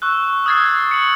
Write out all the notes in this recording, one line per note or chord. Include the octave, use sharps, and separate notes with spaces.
C#6 E6 F#6
D#6 F6 G#6 A6 C7
C#7 F#7